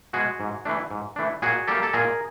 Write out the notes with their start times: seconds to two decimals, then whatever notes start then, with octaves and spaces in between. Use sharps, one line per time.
0.13 B2 G#3 F#4 G#4
0.40 G#2
0.65 E3 A3 D4
0.91 G#2
1.16 E3 A3 D4
1.42 A#2 F#4 G#4
1.67 G3 A#3 G4 A4
1.83 A4
1.93 A#2 G#4 A#4